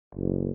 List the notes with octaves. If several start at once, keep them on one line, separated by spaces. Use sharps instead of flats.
F#1